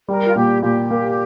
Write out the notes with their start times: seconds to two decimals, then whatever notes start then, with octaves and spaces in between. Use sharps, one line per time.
0.09 G3 A#4
0.26 F4
0.36 A#2 G4
0.62 A#2 G4
0.91 A#3